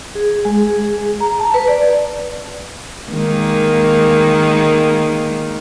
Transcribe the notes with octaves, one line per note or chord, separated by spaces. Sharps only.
G#4
G#3
G#4
A#5
A5
B4
D5
D#3 G#3 A#3